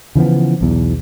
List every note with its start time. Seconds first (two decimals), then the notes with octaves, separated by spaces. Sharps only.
0.15 C#3 E3 F3 B3
0.61 B1 E2